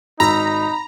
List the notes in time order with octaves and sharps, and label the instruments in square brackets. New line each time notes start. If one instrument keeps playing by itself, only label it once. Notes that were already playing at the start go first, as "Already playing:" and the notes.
[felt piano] G#1 F#4 E6 [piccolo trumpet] D#4 [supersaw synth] A#5 [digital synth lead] B5